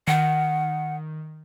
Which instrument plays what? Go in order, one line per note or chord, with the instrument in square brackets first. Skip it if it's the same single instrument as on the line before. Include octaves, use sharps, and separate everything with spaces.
[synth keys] D#3 [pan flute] F#5